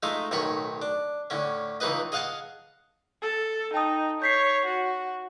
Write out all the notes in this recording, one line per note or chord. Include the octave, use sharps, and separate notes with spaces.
G#3 A3 D#4 F4 E5
B1 A2 D#3 C#5 B5 C#6
D4
A2 D3 C#4
C#2 E3 D#4 G#4 B4 D#5
G#4 D#5 F5 F#5 G#5 A5
A4
D#4 G5 A5 D#6
C#5 G6 B6 C7
F#4